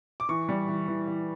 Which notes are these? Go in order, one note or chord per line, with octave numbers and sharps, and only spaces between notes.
D6
E3 C#6
G3
E3
E3
E3